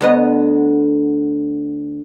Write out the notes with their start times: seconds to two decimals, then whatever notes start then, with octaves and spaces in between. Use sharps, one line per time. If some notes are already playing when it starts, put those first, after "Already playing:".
0.01 D2 B3 D#5